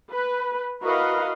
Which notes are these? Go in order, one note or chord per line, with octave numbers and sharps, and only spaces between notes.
B4
E4 F#4 A#4 B4 D#5 F5